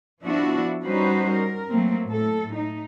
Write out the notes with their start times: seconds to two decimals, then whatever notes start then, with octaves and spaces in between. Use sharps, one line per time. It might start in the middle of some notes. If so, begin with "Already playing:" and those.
0.24 F3 B3 D4 E4 F#4
0.84 G3 C#4 D#4 F#4 B4 C5
1.30 A#4
1.69 F#3 A3 A#3 C4
2.07 A2 A4
2.52 A3 D#4